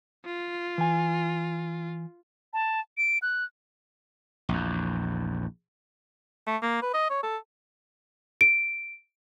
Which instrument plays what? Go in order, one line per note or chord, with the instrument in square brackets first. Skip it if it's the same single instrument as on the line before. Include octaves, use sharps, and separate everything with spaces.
[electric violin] F4
[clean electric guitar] E3 G#5
[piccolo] A5
D7
F#6
[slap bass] A#1 E2
[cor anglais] A3
A#3
B4
D#5
C#5
A4
[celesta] D7